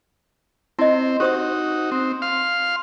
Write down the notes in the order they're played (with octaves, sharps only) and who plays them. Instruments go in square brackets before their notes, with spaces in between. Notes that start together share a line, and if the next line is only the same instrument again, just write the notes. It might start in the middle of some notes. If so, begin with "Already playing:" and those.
[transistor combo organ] C4 [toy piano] E4 D#5
[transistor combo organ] D#4 F#4 [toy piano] G4 C5 D#6
[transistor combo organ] C4
F5 C6